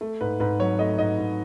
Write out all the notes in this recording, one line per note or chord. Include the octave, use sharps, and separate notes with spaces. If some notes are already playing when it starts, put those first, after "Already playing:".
A3
G#2 B4
G#2 B4
F#3 C#5
A3 D#5
G#2 D#5
G#2